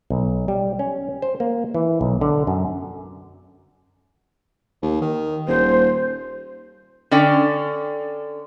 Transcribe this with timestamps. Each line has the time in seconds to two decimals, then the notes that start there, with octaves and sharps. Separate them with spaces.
0.10 B1
0.48 G3
0.79 C#4
1.22 C5
1.40 A#3
1.74 E3
2.01 B1
2.21 D3
2.47 F#2
4.82 D#2
5.01 D#3
5.48 D#1 C5
7.11 D3 C#4 D5 G5